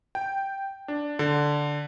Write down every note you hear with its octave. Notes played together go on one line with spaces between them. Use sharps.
G5
D4
D3